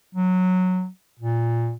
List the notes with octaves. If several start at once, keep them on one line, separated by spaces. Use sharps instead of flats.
F#3
A#2